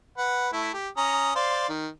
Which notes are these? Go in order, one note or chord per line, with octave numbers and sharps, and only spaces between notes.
B4 F#5
A3 E4
G4
C#4 A#5 D#6
C5 D5 F5
D#3